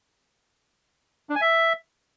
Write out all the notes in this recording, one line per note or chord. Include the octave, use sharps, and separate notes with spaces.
D4
G#5
E5